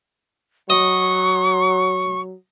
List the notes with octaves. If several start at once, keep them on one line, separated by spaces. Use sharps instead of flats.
F#3 D#5 C#6